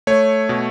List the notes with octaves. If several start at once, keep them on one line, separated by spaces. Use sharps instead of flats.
A3 C#5
B2